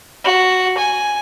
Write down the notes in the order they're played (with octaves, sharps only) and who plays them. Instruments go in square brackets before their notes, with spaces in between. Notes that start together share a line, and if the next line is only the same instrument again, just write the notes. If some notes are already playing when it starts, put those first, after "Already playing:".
[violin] F#4
G#5